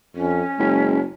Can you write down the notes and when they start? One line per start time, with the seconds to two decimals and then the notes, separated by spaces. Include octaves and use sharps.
0.16 F2 C#4
0.59 F#1 G#3